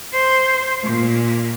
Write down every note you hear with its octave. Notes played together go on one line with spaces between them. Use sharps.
C5
A#2